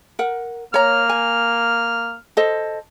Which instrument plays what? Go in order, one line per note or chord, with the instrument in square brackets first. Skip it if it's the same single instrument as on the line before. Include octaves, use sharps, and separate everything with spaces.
[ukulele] A#4 F#5
[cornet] A#3 [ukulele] C#5 A#5 [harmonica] F6
[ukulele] G#5
A4 C5 D#5